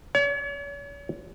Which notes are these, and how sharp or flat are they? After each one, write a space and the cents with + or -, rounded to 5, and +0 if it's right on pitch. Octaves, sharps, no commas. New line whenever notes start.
C#5 +40